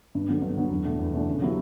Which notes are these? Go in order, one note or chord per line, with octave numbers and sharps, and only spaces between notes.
G2
D3 F#3 B3
G2
D3 F#3 B3
E2
B2 A3 D4
E2
B2 A3 D4
C#3
F#3 B3 E4 G4